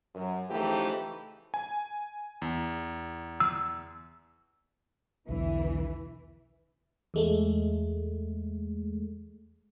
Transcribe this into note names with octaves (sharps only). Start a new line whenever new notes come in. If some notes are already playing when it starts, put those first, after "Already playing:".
F#2
C#3 E3 F3 A3 D#4 G4
G#5
E2
E6
B1 E2 D3 E3
E2 G#3 A3